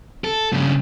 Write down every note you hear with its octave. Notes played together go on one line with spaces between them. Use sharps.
A4
G2 C#3